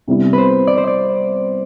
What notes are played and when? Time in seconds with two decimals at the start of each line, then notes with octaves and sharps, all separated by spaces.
0.08 C3 G3 B3 E4
0.33 B4 C5
0.67 D5
0.78 C5
0.87 D5